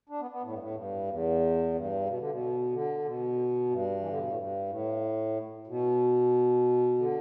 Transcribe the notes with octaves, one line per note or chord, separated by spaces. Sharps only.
D4
B3
B3
A2
G2
A2
E2
G2
E2
G2
B2
D3
B2
D3
B2
G2
E3
D3
B2
A2
G2
A2
B2
D3